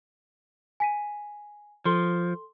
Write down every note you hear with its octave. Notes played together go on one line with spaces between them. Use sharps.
G#5 B6 D#7
F3 A4 C6 G7